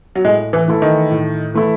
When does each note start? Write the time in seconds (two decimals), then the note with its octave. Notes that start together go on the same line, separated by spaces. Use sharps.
0.15 F#3
0.24 A2 G#3
0.53 E3
0.68 E3 A3 E4 A4
0.82 D#3
1.11 A2
1.54 E3 A3 E4 A4